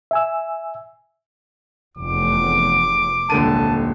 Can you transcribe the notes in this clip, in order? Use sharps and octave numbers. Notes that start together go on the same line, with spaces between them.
E5 G#5 E6
F1 E2 D6
D#1 C2 D3 G#3 A5 D#7